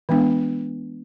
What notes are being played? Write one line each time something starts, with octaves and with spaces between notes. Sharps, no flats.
E3 G#3 B3 D4